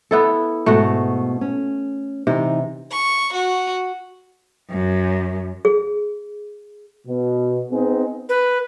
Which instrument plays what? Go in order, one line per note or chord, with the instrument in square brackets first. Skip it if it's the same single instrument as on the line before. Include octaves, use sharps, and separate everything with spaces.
[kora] B3 E4 A4
[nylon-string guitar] G#2 B2 [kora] A3 F#4
[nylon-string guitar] C#4
[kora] C3 [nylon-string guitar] E3 D#4
[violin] C#6
F#4
[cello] F#2
[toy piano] G#4
[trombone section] B2
B3 C4 D#4 G#4
[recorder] B4